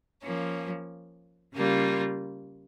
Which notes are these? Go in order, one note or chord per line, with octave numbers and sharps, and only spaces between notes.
F3 A#3 C#4
C#3 G3 A#3 F4